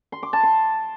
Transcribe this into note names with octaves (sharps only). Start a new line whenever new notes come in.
C6
D6
A5
C6